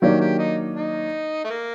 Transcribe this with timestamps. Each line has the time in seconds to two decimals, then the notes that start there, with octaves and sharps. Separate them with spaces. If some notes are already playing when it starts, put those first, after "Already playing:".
0.02 D#3 F#3 A#3 D4 G4
0.21 G4
0.39 D#4
0.76 D#4
1.44 A3
1.50 A#3